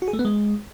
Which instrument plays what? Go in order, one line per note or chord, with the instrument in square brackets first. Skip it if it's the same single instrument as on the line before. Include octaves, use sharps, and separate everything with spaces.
[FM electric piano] F#4
G#4
A3
B3
G#3